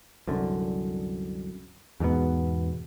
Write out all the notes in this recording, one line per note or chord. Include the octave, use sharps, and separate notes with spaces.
C2 F#2 D3
E2 G#2 B2 B3